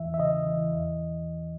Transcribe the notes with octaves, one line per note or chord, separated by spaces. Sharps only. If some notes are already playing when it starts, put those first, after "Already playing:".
Already playing: E2 E3 E5
E5
C#3 D#5
E3
E2